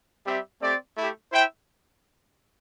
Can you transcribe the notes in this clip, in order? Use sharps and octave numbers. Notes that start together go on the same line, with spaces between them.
G3 C4 G4 E5
A3 C4 G4 D5
A3 E4 G4
E4 C5 E5 G5